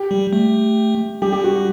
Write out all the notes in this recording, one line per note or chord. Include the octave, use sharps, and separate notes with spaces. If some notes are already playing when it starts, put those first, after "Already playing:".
Already playing: G4
G3
A3
G3 G4
G4
F#4
F#4